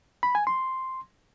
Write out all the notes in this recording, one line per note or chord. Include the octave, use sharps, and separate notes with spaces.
B5
G#5
C6